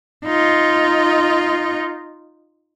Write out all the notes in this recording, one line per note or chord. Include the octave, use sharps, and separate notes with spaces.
D#4 F4